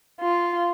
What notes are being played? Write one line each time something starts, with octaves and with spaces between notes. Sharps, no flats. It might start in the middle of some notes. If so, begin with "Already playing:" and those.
F4